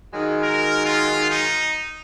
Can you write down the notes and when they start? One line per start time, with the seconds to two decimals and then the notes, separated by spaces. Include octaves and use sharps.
0.12 D#3 F#3 G#3
0.43 A#4
0.85 F4
1.30 D#4